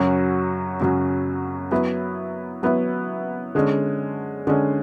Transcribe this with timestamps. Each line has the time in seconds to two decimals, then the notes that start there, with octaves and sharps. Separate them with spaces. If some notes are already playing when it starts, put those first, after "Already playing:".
Already playing: F#2 C#3 F#3 C#4 F#4
0.80 F#2 C#3 F#3 C#4 F#4
1.72 F#3 B3 E4 B4
2.63 F#3 B3 E4 B4
3.55 D3 G#3 C#4
4.47 D3 G#3 C#4